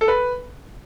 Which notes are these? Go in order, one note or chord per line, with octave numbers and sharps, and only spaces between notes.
A4
B4